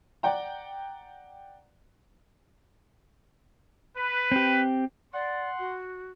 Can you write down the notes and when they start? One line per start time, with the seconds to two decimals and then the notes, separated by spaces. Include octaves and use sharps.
0.23 D5 F#5 G5 A#5
3.96 B4
4.32 C4 G4
5.14 D5 F#5 C6
5.59 F#4